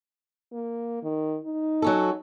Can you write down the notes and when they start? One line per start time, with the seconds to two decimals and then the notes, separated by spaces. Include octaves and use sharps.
0.52 A#3
1.03 D#3
1.45 D#4
1.82 F#3 C#4 A4